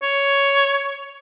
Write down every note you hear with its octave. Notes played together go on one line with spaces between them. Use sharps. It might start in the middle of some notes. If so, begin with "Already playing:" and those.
C#5